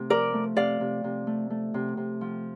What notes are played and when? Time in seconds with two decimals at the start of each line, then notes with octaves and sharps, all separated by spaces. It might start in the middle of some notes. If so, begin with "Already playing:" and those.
Already playing: C3 A3
0.10 F3 A#4 D5
0.34 A3
0.57 C3 D5 F5
0.81 C3
1.04 C3
1.27 A3
1.50 A3
1.74 C3
1.97 C3
2.21 F3